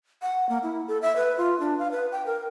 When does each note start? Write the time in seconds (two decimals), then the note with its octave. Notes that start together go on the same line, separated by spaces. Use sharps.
0.22 F#5
0.49 A#3
0.63 E4
0.88 A4
1.02 E5
1.16 B4
1.37 F4
1.60 D4
1.79 F5
1.91 B4
2.12 G5
2.26 A#4